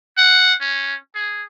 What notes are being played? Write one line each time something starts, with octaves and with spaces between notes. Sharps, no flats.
F#5
C#4
G#4